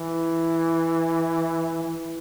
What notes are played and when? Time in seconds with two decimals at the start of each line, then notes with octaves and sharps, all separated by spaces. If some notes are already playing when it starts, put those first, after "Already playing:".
Already playing: E3
1.84 E3